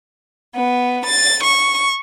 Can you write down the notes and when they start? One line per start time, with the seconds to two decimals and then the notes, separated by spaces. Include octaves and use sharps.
0.54 B3
1.03 A6
1.42 C#6